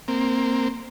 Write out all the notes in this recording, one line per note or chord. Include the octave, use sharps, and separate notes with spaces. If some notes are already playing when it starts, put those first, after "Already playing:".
A#3 C4